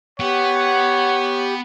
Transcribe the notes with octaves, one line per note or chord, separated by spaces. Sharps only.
B3 G4 C#5 F#5